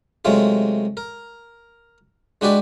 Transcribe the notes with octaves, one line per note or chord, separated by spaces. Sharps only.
C3 F#3 G#3 A3 F4
A#4
G#3 D4 F#4 G4 B4 D5